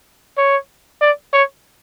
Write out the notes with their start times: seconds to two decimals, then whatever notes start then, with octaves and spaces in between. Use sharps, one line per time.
0.38 C#5
1.01 D5
1.33 C#5